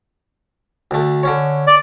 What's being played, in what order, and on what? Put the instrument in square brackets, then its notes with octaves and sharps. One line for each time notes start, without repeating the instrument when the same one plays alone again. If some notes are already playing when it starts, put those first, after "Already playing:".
[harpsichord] D2 A3
D3 C#4 C#5
[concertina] D5